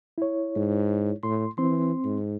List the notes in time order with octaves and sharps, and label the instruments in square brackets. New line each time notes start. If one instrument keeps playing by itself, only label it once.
[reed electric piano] E4 C#5
[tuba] G#2
[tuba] A2 [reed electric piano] C6
[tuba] E3 [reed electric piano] C4 C6
[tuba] G#2